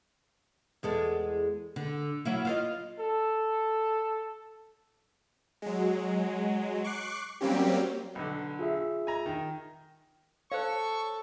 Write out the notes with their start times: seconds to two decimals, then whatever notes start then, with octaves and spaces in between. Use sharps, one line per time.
0.83 E2 G#3 A4
1.76 D3
2.25 F#3 A#3 E4
2.45 F4 C5 D#5
2.99 A4
5.62 F#3 G#3
6.84 C#6 D6 F#6 C7
7.41 F#3 G3 A#3 C4 C#4 G4
8.15 B1 D3
8.59 F4 G#4 E5
9.07 G#5 A#5
9.26 D#3
10.52 A4 C5 C#5 F5 C#6